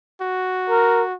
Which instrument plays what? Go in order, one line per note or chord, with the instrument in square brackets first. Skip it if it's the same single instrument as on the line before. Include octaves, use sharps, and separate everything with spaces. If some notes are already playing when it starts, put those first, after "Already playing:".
[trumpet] F#4
[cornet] A#4